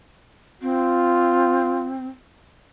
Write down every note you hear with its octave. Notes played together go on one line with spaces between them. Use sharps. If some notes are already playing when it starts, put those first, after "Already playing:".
C4 F4